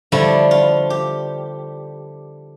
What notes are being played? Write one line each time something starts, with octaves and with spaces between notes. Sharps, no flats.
D3 F3 G3 A3 E4
F4
G4